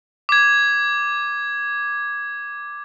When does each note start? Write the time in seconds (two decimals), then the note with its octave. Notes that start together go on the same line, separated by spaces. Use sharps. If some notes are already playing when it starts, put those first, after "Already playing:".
0.29 D6 G#6